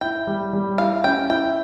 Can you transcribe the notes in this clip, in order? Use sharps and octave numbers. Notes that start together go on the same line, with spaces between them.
E4 G5
G3
G3
E4 F5
C#4 G5
E4 G5